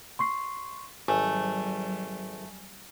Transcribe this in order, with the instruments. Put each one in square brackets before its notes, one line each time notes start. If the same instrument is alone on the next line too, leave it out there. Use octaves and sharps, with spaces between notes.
[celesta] C6 C#6 C7
[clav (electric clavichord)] G#1 [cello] F#3 G3 [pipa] A3 [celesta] G#5